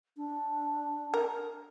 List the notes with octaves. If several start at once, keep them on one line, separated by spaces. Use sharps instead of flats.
D4
A#4